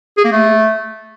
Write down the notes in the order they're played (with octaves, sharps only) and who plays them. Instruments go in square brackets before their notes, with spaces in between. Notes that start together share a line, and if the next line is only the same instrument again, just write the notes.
[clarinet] G#4
A#3
A3